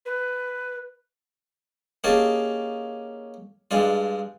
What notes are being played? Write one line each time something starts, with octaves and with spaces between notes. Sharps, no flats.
B4
A#3 C#4 D#4 G4 G#4 A5
G2 G#3 D4 F4